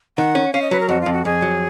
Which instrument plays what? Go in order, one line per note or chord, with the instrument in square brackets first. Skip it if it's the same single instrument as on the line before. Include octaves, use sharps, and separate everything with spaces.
[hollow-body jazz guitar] D#3 [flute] F#5
[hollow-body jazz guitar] C#4
[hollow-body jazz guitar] C#4 [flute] F5
[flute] D#5
[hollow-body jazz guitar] F#3 [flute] B4
[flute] A#4
[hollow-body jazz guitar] F2 [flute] F#4
[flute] F4
[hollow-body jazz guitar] F2
[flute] F#4
[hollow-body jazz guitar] F2 [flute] G#4
[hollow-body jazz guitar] F#3